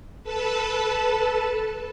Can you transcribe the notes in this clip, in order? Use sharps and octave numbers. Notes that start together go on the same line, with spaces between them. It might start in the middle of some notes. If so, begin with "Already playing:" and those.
A4 B4 A5